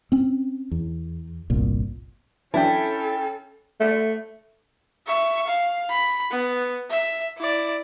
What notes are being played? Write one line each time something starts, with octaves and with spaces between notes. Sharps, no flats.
C4 C#4
E2
G1 C2 A#2
E3 F#3 C#4 D4 E4 A4 G5 A5
A3
E5 C#6
F5
B5
B3
E5
E4 D5